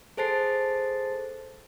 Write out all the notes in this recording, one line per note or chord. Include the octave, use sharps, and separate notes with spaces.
G#4 A4 C5 A5 A6 C7